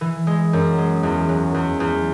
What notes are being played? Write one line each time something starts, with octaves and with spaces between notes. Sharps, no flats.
E3
G#3
F#2
G#3
E2
F#3
E2
E2